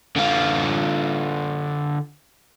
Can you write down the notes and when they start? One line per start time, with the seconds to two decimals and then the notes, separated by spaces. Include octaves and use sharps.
0.16 D3 F4